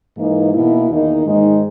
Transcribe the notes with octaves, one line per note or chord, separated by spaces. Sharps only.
G#2 E3 A#3 D#4
B2 A#3 E4
E2 D#3 A#3 D#4
G#2 D#3 G#3 D#4